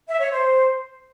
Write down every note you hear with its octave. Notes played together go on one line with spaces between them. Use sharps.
E5
C#5
C5